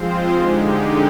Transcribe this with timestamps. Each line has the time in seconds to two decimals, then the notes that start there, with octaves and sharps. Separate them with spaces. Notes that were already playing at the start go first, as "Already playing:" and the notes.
Already playing: F3 G#3 C4 F4 C5
0.28 D3 G#3 D#4 G4